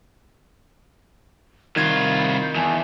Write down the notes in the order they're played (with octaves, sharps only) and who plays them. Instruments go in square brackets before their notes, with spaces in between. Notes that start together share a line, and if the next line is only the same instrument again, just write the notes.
[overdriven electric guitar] C2 F4 [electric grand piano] D#3 G#6 [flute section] B5
[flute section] D#5 G6
[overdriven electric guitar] E2 [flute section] D#5 G#5 A5